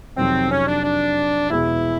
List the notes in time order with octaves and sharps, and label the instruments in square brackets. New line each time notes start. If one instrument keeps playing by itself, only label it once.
[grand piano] F2 C3 D#3 F#3 [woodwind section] C4
[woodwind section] C#4
D4
D4
[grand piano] E2 B2 G#3 B3 [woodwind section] E4